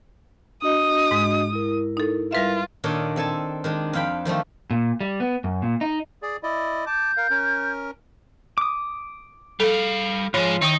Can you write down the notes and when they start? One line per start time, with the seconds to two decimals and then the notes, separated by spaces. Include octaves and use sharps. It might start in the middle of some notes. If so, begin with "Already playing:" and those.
0.62 D4 F#4 D#5 D#6
1.11 G#2 G#3
1.52 E4 A#4
1.97 D#4 A4
2.33 G3 F4 B4 E5
2.84 A#2 D#3 D4 A4 C#5 D#5
3.16 C4 A4 G#5 A5
3.64 D#3 G#3 D4
3.93 F2 C5 F5 G5 B5
4.25 D#3 F3 G3 A3
4.71 A#2
5.01 G3
5.20 B3
5.44 F#2
5.62 A#2
5.81 D#4
6.22 G#4 D5
6.43 E4 D5 D#5
6.87 A5 D6 G6
7.17 A#4 F5
7.30 C#4 A#4
8.58 D6 D#6
9.60 G3 A4 F5
10.34 G#2 F3 G#3 F4 C#5 B5
10.62 D#3 D#4 E4 G5 D#6